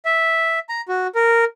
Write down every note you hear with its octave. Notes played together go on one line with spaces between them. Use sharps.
E5
A#5
F#4
A#4